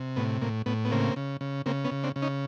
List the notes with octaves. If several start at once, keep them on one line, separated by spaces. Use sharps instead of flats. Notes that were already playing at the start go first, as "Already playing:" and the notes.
Already playing: C3
A2 B3
A2 A#3
A2 B3
B3
C#3 A#3 C4
C#3
C#3
C#3 A#3 C4
B3 C#4
C#3
C4 D4
C#3
C#4 D#4